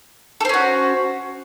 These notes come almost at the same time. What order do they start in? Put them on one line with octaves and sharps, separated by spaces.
A4 C5 C#4 F#4